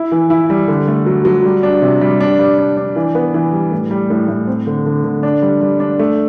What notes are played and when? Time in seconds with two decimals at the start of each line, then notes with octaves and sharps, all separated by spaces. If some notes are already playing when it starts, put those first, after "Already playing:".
Already playing: E4
0.12 E3
0.30 E4
0.50 G3
0.68 D3
0.88 A3
1.06 F#3
1.25 F#3
1.45 G3
1.63 D4
1.82 C3
2.01 G3
2.21 D4
2.39 G3
2.58 D4
2.77 D4
2.96 E3
3.15 B3
3.34 E3
3.53 G3
3.71 A2
3.91 G3
4.10 A2
4.28 A2
4.47 C4
4.67 D3
4.86 D3
5.04 D3
5.23 D4
5.42 G3
5.61 G3
5.80 D4
5.99 A3